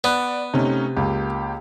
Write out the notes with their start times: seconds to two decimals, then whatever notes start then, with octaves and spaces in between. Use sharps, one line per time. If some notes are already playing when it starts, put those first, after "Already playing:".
0.04 B3 D5 F#5 F#6
0.54 C3 A3 C#4 D#4
0.97 C#2 A#3 G4